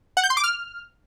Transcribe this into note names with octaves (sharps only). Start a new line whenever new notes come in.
F#5
G6
C6
D6
F6